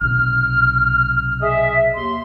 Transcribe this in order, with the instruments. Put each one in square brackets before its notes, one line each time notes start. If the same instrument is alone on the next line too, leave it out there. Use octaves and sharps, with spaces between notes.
[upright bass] B1 C3 [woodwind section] F6
[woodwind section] G#4 D#5 E5
D#2 C6